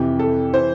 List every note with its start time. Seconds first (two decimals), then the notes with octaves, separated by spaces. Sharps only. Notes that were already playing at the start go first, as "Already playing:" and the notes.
Already playing: F2 C3 E3 G4
0.19 A4
0.54 E3 C5